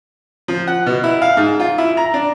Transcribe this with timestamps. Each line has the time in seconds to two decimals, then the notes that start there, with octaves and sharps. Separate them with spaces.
0.48 F3
0.67 F#5
0.86 B2
1.04 E4
1.22 F5
1.37 G#2
1.60 F4
1.78 E4
1.97 A#5
2.14 D4